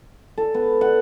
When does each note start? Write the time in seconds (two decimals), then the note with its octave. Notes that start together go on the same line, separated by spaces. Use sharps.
0.38 A4
0.54 B3
0.81 F#5